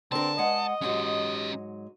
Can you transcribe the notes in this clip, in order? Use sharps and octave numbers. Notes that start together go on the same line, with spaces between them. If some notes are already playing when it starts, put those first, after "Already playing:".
D3 C4 A#4 A5
G#3 D#5 F#5
G#2 F#3 G#3 C#4 G4